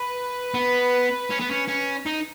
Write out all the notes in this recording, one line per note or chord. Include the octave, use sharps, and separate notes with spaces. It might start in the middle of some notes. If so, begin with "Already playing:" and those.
Already playing: B4
B3
C#4
B3
C#4
C#4
D#4